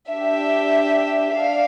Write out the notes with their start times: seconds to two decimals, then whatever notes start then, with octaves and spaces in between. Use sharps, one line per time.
0.10 D4 G4 E5
1.36 D4 F5